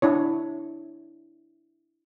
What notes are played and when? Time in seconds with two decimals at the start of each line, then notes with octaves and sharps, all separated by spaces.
0.02 D4 E4 C#5